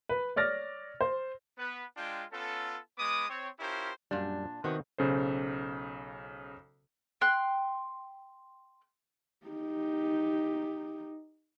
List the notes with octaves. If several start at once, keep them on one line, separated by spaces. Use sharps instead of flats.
B4
C#5 D5 F6 A6 A#6
C5
B3 B4
G#3 D4 F4 G5
B3 C#4 F4 A4
G#3 B3 B5 D6 D#6
C4 C#5
C#4 E4 F4 G4 A#4 C5
F#2 A#2 G3 D4
C3 D#3 B3 C4 F#4
B1 C#3 A4 C5
G5 C6 F#6
D#4 G4